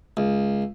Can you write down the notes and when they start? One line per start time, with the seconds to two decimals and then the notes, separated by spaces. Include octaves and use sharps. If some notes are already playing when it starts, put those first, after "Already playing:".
0.17 C#2